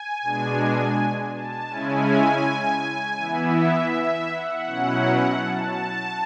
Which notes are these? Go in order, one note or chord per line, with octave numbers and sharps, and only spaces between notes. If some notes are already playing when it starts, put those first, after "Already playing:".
Already playing: G#5
B2 G#3 D4
A5
C#3 G#3 C#4 E4 G#5
E3 B3 E4 E5
E5
F#5
B2 F#3 C#4 E4
A5